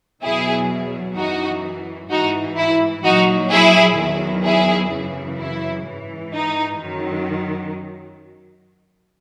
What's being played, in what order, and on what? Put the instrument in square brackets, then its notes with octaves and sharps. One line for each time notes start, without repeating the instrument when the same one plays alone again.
[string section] E2 B2 F#3 E4 G#4
F#2 E3 D#4 F#4
G#2 E3 D#4 F#4
E4
A#2 F#3 D#4 F#4
E4 G#4
E2 D#3 F#3
E4 G#4
F#2 C#3 E3
E4
G#2 E3
D#4
F#2 D#3 F#3